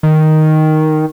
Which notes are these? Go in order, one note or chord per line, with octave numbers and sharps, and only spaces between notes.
D#3